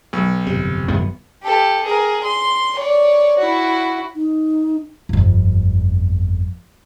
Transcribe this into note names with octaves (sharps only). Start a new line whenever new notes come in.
B1
G1 F2 C3
G#1 F#2 B3
G4 A4
G#4 A#4
C6
C#5 D5
E4 F#4
D#4
G1 F2